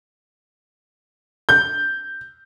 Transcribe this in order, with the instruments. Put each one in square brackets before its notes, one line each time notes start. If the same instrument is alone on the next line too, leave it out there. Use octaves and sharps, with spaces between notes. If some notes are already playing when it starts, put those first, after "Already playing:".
[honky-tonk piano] G6